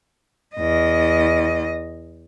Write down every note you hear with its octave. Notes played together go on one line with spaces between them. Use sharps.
E2 D#5